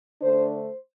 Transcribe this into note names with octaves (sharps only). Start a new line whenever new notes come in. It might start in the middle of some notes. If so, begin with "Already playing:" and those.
D3 A3 D4 C5
C5